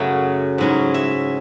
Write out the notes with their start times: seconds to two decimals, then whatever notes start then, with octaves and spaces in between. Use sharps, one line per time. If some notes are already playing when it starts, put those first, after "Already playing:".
Already playing: F#2 C#3 F#3 A3 C#4 E5
0.58 G#2 F#3 C#4 E4
0.94 E5